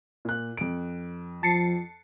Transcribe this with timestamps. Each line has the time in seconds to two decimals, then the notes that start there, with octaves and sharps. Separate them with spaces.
0.25 A#2 F#6
0.57 F2 D7
1.43 F3 A5 C7 C#7